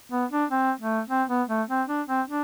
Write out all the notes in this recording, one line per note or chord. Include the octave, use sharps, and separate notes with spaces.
B3
D4
C4
A3
C4
B3
A3
C4
D4
C4
D4